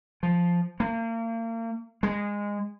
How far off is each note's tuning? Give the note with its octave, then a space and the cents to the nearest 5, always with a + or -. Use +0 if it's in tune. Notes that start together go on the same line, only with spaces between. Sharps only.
F3 +0
A#3 -35
G#3 -20